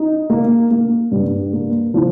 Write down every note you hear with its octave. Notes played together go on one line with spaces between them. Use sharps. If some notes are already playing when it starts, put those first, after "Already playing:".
Already playing: D#4
A#3
A#3
G2
A#3
F3